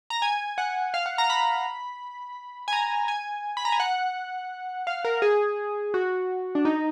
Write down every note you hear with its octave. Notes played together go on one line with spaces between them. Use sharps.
A#5
G#5
F#5
F5
F#5
A#5
B5
G#5
A#5
G#5
B5
A#5
G#5
F#5
F5
A#4
G#4
F#4
D4
D#4